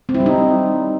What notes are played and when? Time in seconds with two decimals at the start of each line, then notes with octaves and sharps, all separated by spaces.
0.09 C4
0.15 E4
0.20 G3
0.26 D#4